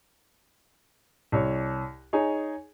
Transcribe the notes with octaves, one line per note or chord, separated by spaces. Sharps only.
C2 C#5
D#4 G#4 C#5 G#5